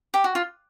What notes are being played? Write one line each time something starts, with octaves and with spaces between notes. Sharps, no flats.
G4
F#4
F4